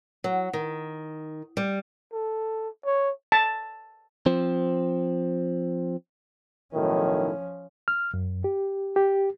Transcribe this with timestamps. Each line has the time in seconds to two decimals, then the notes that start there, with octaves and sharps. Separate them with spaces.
0.24 F#3
0.53 D#3
1.57 G3
2.13 A4
2.85 C#5
3.32 A5
4.26 F3 C4
6.74 B1 A2 D#3 F3 C#4
7.88 F6
8.14 F#2
8.44 G4
8.96 G4